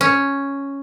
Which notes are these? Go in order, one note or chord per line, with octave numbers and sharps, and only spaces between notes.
C#4